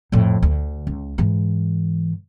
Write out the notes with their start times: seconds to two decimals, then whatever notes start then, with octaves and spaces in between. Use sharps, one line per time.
0.12 F2 A2
0.43 D2
0.87 C#2
1.18 G#2 E3